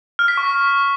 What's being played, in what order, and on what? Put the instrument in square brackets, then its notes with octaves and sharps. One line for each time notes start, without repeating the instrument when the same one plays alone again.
[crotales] F6
B6
C#6